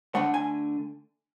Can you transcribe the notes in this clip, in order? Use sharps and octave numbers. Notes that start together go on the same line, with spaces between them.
D3 A3 F#5
G#5